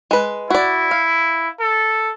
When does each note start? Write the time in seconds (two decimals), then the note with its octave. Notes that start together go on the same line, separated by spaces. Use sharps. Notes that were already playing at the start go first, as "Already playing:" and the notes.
0.11 G#3 B4
0.50 E4 F#4 D5
0.91 F5
1.61 A4